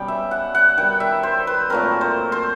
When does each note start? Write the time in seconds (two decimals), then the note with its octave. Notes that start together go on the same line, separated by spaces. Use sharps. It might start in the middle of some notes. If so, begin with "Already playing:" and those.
Already playing: B2 G3 B3 C#4 G5
0.08 E5
0.31 F#5
0.55 F#5
0.78 D#3 G3 B3 G5
1.00 E5
1.23 C5
1.47 B4
1.70 A#2 F#3 A3 C4 A#4
2.01 C5
2.32 C5